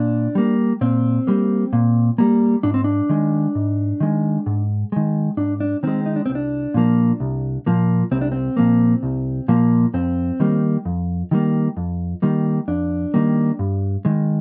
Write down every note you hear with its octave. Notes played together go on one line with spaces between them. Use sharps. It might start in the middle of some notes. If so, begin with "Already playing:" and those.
Already playing: A#2 D4
G3 A#3
A#2 C4
G3 A#3
A#2
G3 A#3
G#2 D4
C4
D4
D#3 G#3
G#2
D#3 G#3
G#2
D#3 G#3
G#2 D4
D4
D#3 G#3 C4
D#4
D4
C2 C4
D4
A#2 F3 A#3
C2
A#2 F3 A#3
C2 C4
D4
C4
A#2 F3 A#3
C2
A#2 F3 A#3
F2 C4
D#3 G3 A#3
F2
D#3 G3 A#3
F2
D#3 G3 A#3
F2 D4
D#3 G3 A#3
G2
D#3 G#3